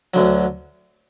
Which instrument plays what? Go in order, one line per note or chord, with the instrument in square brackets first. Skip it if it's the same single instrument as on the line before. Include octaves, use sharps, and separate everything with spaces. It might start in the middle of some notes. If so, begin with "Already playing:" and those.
[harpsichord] D2 D3 F#3